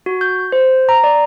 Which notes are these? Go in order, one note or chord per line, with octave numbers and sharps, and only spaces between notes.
F#4
G6
C5
A#5
D5